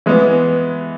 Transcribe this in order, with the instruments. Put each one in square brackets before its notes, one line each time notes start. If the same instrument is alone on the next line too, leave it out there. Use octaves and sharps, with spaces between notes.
[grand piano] E3 G#3 B3